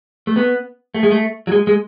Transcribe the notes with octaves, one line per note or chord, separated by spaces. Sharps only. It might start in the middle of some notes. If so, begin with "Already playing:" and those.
A3
B3
A3
G#3
A3
F#3
G#3
G#3